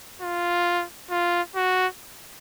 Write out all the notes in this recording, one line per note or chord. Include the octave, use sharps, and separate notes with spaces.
F4
F4
F#4